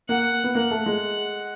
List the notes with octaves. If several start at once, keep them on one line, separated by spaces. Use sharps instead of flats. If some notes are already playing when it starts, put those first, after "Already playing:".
A#3 F#5
B3
A#3 F#5
A3
G#3